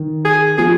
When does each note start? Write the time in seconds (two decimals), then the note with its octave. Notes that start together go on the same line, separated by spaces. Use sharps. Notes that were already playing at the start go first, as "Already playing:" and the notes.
Already playing: D#3
0.25 G#4
0.57 F3 G#4